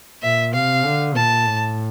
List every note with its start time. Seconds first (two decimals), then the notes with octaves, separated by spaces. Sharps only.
0.22 A#2 E5
0.54 C3 F5
0.85 D3
1.15 A#2 A5
1.46 A2